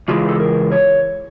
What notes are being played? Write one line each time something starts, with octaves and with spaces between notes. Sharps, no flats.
C#3 E3 G#3 F4
A4
A#4
C#5